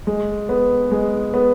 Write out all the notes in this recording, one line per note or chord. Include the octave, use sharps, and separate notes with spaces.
G#3
B3
G#3
B3